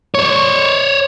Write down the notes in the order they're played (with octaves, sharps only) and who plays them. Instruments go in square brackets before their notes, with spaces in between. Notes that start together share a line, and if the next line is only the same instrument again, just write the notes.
[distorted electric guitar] C5 C#5